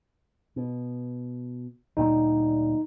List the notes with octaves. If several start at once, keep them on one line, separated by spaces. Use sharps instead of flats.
B2
D2 A#2 G3 D#4